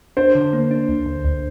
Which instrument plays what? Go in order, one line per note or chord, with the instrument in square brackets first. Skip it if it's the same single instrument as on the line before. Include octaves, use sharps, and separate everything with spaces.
[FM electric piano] D4 [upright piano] C5
[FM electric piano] D3
A#3
D4
D2
D2
D2